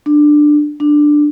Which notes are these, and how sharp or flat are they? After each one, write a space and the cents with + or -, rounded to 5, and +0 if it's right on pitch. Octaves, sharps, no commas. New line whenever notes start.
D4 +15
D4 +10